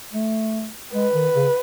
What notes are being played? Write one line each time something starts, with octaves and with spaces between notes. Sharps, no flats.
A3
G#3 B4
D#3
C#3